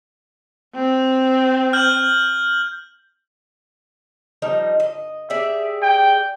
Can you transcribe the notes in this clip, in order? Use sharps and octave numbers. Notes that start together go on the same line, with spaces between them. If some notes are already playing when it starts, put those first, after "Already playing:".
C4
F6 G6 F#7
F3 G3 D#4
D#5
G4 G#4 D5 E5
G5